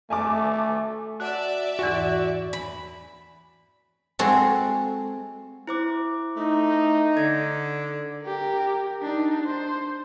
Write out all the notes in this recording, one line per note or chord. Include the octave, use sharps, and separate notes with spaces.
A3 G#5 A5 D6
F#4 D5 E5 F#5 A5
E2 G#2 E3 F#4
B5
G#3 C4 F#4 A4
E4 C5 D6
A3 D#4
D3 G#6
G4 A#4
D4 D#4
C5